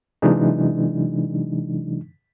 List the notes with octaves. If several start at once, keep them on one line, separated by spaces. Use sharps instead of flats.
C3 E3 F#3 G#3 D4 D#4